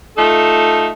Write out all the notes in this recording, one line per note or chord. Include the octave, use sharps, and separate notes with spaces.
A3 D#4 F4 A4